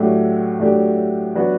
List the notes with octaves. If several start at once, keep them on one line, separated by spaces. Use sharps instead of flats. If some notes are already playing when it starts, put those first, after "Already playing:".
Already playing: A2 F#3 A3 D4 G4
A2 F#3 A3 D4 G4
F#3 B3 D4 F#4